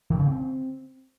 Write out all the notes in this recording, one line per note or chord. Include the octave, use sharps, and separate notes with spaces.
D#3
C#3
C4